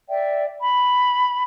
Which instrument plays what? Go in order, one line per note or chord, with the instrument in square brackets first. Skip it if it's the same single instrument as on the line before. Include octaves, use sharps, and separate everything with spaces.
[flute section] D5 E5 G5
B5